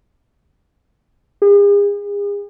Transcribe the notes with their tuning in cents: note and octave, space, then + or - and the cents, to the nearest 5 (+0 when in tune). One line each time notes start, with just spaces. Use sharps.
G#4 -40